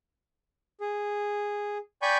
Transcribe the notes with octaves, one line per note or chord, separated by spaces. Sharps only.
G#4
D5 G5 G#5 B5 C#6 G6